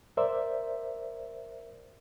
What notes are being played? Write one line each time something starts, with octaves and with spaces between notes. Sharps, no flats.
A#4 C5 D5 E5